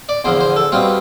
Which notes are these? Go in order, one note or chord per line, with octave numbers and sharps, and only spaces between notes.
D5
E2 D3 F3 C5
C5
A4
B2 G3 C4 F4